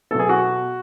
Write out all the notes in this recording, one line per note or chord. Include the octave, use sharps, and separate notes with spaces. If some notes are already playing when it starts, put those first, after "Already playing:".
B2 F#3 A3 A4
G#4
F#4